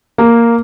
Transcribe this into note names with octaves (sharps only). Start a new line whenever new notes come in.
A#3